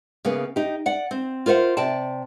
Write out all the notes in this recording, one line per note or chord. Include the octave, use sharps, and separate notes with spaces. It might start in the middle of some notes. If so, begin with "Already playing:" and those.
C#3 A#3 B3
D#4 G4
D5 F#5
C4
F4 A#4 C5 E5 F#5
C3 D5 G5 A5